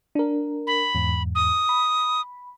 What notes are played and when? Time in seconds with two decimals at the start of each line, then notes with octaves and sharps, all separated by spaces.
0.15 D4 A#4
0.67 B5
0.95 E2 G#2
1.35 D#6
1.69 B5